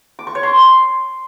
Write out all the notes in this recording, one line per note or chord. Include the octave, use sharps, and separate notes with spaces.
D6
C#6
C#5
C6